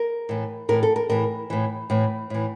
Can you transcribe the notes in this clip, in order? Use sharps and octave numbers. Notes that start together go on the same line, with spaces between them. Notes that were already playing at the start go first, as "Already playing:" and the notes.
Already playing: A#4
A2 E3
A2 E3 A#4
A4
A#4
A2 E3 A#4
A2 E3
A2 E3
A2 E3